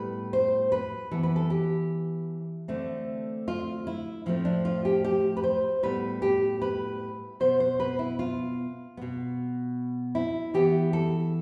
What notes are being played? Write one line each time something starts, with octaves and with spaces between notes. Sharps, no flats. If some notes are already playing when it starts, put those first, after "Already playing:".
Already playing: A2 G3 B3 B4
C5
B4
E3 B3 A4
B4
A4
G4
D3 A3 C4
F4
E4
A2 F3 A3 C4
D4
F4
G4
G4
B4
C5
A2 G3 B3 B4
G4
B4
B2 B3 C5
C5
B4
E4
F4
B2 B3
E4
E3 B3 G4
A4